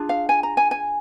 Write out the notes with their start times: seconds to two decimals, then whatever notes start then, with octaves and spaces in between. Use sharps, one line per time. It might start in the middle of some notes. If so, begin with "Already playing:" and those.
Already playing: D4 F4 G#4
0.09 F5
0.29 G#5
0.43 A#5
0.57 G#5
0.71 G#5